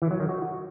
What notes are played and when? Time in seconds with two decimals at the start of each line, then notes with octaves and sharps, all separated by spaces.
0.02 E3
0.11 F#3
0.20 D#3
0.29 F#4